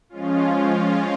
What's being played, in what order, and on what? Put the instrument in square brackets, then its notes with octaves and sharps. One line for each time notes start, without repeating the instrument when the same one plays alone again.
[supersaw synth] F3 G#3 C#4 F4